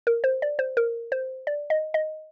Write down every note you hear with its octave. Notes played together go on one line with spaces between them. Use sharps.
A#4
C5
D5
C5
A#4
C5
D5
D#5
D#5